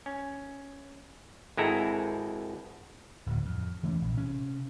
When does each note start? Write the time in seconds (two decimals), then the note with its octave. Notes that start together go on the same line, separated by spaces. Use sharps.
0.06 C#4
1.57 G#1 G#3 C4 E4 A4 A#5
3.26 D1 D2 A2
3.46 F2
3.83 E3 A3 C4 C#4
4.01 A#1
4.14 C3 C#4